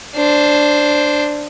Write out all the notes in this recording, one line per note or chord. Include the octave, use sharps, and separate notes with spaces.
D4 C5